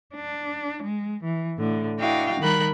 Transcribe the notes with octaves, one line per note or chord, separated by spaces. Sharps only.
D4
G#3
E3
A2 D3
D4 E4 F#4 D#5 F5 G5
D#3 G3 A#4 B5 F#6